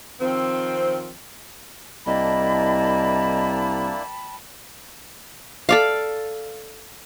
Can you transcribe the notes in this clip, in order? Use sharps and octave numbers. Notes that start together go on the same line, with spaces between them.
D#3 F3 C4
C2 A#3 D4 E4 D#5 G5 A5 B5
A4 D5 F5